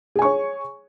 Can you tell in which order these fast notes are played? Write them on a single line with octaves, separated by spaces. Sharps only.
G#4 G#5 C#6 C#5